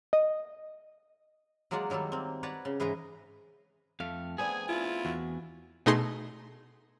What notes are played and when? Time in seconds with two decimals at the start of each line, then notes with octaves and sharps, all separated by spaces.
0.13 D#5
1.71 F#3 G#3 A#3 F4 D5 F#5
1.90 D#3 F#3 G3 A#3 A4
2.12 A#3 C4
2.43 B4 C#5 D5 F#5 A5 A#5
2.65 C#3
2.80 G#2 E3 B4 D#5 A#5 C6
4.00 F2 A3 F5
4.38 B3 C4 D4 G#4 G#5
4.68 E4 F4
5.05 E2 F#4
5.86 B2 A3 D#4 G#4 D#5 C6